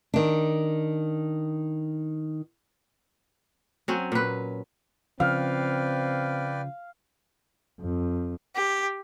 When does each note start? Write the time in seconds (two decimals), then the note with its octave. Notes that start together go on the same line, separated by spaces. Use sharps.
0.14 D#3 D4
3.88 F#3 C4 C#4
4.12 A#2 B4
5.20 C#3 F3 C4 B4 D5 F5 G5
7.81 F2
8.56 G4